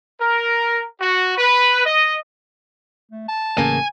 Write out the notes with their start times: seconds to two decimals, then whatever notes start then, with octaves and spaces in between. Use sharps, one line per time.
0.20 A#4
1.01 F#4
1.38 B4
1.85 D#5
3.11 A3
3.29 A5
3.58 A1 C#3 A#3 G#5